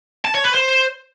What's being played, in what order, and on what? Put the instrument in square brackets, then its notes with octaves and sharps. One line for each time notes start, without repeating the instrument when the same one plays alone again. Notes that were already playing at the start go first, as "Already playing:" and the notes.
[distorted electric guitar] A5
C#5
B4
C5